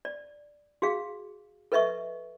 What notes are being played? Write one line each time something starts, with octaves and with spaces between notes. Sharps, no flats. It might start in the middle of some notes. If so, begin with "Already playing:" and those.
D5
F#4 G#4 F5
A4 B4 D#5 E5 C#6